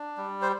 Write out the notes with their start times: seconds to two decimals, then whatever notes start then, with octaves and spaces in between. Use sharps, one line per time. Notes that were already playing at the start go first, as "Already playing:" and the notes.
Already playing: D4
0.17 G3
0.42 C5